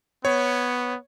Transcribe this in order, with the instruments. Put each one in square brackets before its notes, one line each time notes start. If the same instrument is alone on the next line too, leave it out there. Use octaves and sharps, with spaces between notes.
[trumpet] B3 [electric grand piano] C#5